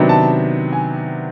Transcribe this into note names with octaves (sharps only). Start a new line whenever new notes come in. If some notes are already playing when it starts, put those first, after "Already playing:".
Already playing: C3 D#3 F#3 B3 D4
A5
G#5